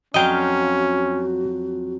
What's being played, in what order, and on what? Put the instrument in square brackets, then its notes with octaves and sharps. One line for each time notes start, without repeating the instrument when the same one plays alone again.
[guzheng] F2 F#3 F5 [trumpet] C#4 [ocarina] F#4 [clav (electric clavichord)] D#5 G5